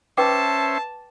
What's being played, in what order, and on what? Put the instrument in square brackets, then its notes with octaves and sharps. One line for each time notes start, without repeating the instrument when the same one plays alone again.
[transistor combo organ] C#4 C5 E5 [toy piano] B4 G5 D6 [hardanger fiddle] A5